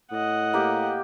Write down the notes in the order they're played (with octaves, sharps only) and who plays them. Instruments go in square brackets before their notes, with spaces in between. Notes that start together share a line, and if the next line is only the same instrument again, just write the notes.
[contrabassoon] A2 [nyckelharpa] D#5 F#5
[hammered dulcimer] A#3 G4 G5